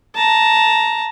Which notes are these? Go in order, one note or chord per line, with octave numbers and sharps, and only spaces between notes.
A5 A#5